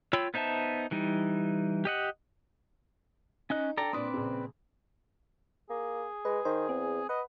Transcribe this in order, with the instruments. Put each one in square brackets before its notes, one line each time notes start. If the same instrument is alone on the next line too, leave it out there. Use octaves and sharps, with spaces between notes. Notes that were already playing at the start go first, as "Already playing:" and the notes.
[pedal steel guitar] F4 C#5 G5 B5 E6
B3 D#4 C5 E5 A5
E3 G3 D#4
G4 D#5 F#5
[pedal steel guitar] C#4 D#5 F#6 [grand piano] D#4
[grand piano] D4 G5 [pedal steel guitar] A4 D5 A#5
[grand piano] A#2 D4 D#6 [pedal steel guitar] C4 B4 D5
[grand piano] A#1 C#3
[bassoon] A#3 [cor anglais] G#4
[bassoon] G#3 [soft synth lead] B4
[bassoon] D#3 [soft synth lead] C5
[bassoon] E2 [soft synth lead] C4
[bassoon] B4 [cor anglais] D#5 [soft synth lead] F#5